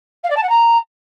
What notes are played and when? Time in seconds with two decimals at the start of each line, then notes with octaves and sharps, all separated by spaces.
0.23 F5
0.30 D5
0.36 A5
0.43 F#5
0.49 A#5